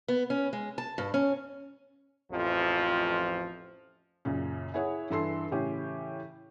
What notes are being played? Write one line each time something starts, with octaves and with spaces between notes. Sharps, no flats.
B3
C#4
G#3
A5
G2
C#4
A1 F2 F3
F#2 A#2 C#3
E4 G#4 C#5 F#5
G2 E3 A4 C6 C7
A2 C#3 E3 C#4 G4